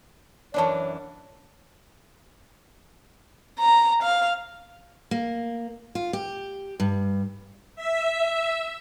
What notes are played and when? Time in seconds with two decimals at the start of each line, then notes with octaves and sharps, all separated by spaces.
0.54 F#2 E3 D4 C#5 D5 A5
3.59 A#5
4.02 F5
5.11 A#3
5.95 F4
6.13 G4
6.80 G2
7.76 E5